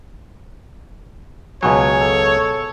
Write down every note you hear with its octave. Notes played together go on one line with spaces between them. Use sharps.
C#2 B2 F#3 C#5 G#5
A4